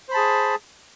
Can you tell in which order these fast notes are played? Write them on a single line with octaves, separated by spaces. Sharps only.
C5 B5 A5 G#4